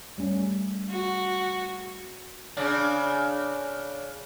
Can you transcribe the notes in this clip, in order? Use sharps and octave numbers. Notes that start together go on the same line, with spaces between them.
G3 A3 C#4
F#4
C#3 D4